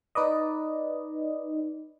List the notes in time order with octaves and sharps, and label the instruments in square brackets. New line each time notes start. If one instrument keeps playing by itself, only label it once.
[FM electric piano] D#4 B4 D5 D#5